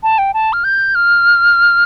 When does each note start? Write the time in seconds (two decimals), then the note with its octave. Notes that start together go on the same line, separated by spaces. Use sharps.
0.03 A5
0.18 G5
0.34 A5
0.53 F6
0.64 G6
0.95 F6